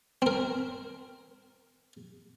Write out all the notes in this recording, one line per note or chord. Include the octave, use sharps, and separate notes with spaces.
C4 A#4